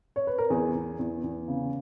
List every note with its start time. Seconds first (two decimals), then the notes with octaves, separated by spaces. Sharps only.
0.16 C#5
0.27 B4
0.38 A#4
0.50 E2 G#4
0.75 E2
0.99 E2
1.24 E2
1.48 C#3